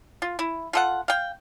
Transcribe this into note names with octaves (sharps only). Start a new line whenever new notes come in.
F4
E4
F4 A4 F#5
F5 G5